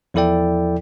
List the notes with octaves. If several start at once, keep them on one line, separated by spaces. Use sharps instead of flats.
E2 F3 E4 A4 D5 G5